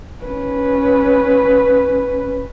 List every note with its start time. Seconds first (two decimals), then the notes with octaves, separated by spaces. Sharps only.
0.24 C#4 B4